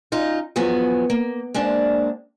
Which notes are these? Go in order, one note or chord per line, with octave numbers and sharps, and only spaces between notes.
F#2 D#4 F4
E2 F3 F#3 B3 G#4 G#5
A#3
G#3 A#3 C4 D4